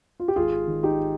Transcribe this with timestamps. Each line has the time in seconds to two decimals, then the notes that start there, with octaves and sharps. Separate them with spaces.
0.20 F4
0.28 G4
0.36 G#1 F4 G#4
0.67 D#3
0.83 D#4 G4